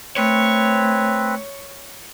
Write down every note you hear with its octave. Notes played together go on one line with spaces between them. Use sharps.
A3 C4 B4 C#5